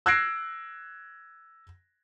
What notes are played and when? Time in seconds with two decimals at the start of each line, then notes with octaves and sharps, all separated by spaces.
0.06 E6 F#6 G#6 A#6 C7 D7